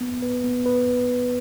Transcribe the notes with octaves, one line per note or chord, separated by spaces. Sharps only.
B3
B4
B3
B4